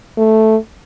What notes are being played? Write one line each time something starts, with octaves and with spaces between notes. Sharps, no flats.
A3